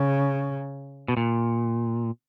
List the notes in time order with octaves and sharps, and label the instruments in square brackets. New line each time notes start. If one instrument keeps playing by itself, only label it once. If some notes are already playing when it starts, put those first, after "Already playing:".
Already playing: [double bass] C#3
[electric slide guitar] B2
A#2